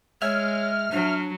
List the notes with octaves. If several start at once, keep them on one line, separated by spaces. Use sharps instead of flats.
G#3 C#5 E5 G#5 F6
F#3 D4